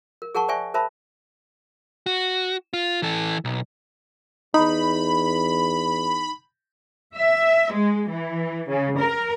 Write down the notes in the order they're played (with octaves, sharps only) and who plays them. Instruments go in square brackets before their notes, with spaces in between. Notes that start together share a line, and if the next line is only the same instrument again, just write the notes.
[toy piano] A#4
G#4 A#4 F#5 A5 C#6
C5 D5 E5 G5 G#5 C#6
A#4 C5 E5 A5 B5
[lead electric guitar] F#4
F4
E3 A4
B1
[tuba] E2 [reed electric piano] D#4 [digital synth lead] B5
[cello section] E5
G#3
E3
C#3
A#4